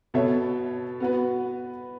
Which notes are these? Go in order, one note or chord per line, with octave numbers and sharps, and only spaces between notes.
B2 B3 A4 C#5 E5
B3 F#4 B4